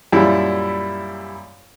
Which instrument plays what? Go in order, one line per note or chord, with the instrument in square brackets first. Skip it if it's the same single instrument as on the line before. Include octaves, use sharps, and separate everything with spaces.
[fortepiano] F#2 A#2 G3 E4